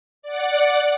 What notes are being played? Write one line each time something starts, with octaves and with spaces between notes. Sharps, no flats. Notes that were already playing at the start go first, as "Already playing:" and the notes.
D5 F#5